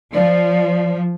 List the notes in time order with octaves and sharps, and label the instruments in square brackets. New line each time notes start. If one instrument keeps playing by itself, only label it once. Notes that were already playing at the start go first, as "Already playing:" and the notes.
[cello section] F3 [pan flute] D5